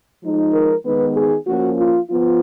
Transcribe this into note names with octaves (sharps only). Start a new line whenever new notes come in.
F3 G#3 D#4
A#4
D#3 G#3 B3 D#4 B4
G#4
F3 A#3 C#4 F#4
F4
F3 B3 F4